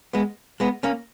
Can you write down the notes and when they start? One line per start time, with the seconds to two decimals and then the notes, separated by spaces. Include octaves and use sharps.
0.13 G#3 B3
0.60 G#3 B3
0.83 A#3 C#4